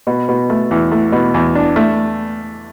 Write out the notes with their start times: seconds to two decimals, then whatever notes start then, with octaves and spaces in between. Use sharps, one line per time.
0.07 B2
0.29 B2
0.50 A3
0.71 E2
0.92 A3
1.12 B2
1.34 E2
1.55 D4
1.76 A3